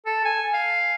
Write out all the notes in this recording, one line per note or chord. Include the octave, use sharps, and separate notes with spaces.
A4
G#5
F5